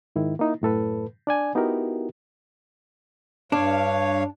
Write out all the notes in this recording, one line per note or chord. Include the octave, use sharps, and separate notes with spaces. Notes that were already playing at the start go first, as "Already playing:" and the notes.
G#2 D#3 E4
A#3 D#4 E4
F#2 A2 A4 B4
D4 D5 G#5
B3 D#4 E4 F#4 G4 A#4
G2 D4 C#5 F5